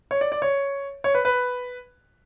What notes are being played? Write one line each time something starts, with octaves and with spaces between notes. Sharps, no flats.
C#5
D5
D5
C#5
C#5
B4
B4